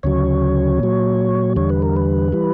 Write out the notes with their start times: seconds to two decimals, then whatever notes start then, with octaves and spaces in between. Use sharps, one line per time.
0.03 D2 C#3 F#3 C#5
0.80 A#2 F#3
1.56 E2 D3 G3 C#5
1.70 B4
1.82 A#4
1.96 B4
2.32 E3 G3